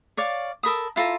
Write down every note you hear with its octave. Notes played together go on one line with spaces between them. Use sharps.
C#5 D5 F5
A4 A#4 B5 D#6
E4 F4 A4 A#5